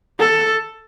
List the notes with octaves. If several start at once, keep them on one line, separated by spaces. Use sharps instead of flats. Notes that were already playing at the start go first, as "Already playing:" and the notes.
A4